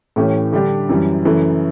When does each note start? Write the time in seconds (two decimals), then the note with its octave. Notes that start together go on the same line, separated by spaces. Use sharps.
0.16 A2 E3 A3 C#4 G4
0.53 D3 G3 D4 G4
0.89 F#2 E3 G3
1.25 F#2 C#3 E3 A3 E4